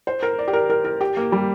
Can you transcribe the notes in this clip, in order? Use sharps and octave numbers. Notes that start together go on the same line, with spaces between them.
C5
A#4
D5
G4
A#4
A#4
A#4
G4
A#3
G3